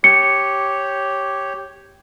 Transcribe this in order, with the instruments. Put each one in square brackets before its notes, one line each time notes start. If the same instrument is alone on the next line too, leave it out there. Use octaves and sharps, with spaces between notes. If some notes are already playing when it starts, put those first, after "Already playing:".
[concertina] G4 C#5 [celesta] C#7